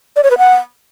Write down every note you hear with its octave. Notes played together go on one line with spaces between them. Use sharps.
D5
C#5
B4
F#5